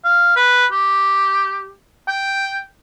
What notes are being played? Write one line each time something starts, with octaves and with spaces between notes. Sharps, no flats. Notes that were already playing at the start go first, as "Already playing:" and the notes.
F5
B4
G4
G5